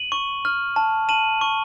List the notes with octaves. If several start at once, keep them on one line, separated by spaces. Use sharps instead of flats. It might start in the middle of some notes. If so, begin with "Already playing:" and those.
Already playing: D#7 F#7
C#6
F6
A5
A5 D#7 F#7
C#6